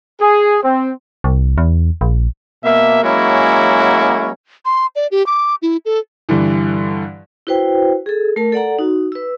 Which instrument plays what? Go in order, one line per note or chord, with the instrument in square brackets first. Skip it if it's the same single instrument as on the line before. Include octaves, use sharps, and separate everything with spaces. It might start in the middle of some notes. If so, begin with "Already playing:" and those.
[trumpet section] G#4
C4
[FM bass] C2
E2
A#1
[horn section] B2 A#3 E5
F#3 G#3 A#3 C#4 E4 F#4
[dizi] C6
D5
G4
D6
E4
A4
[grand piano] G2 D3 E3
[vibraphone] E4 F#4 B4 C5 G5
G#4 A4
A3 A#4 A5
A4 D5 F#5 A#5
D#4 F#4
B4 E6